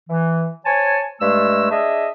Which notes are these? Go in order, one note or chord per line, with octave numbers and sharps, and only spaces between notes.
E3
C5 C#5 G#5 A5
G2 G#3 A3 E6
D4 G#4 D#5 E5